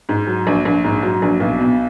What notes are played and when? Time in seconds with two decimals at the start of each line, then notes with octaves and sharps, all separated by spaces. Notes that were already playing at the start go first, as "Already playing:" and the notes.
0.09 G#2
0.27 F#3
0.47 A#1
0.65 A#1
0.84 G#2
1.03 F#3
1.22 A#1
1.40 B1
1.60 B2